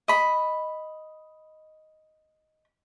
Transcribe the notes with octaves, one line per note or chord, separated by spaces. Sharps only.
D#5 B5